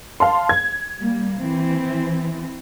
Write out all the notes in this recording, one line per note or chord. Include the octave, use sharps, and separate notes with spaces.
F5 A5 C6
G#6
G3 A#3
E3 C4